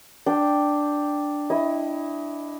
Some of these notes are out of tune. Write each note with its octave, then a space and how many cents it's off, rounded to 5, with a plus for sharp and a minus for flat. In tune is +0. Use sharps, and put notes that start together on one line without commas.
D4 +0 G5 +0
E4 +0 D#5 +20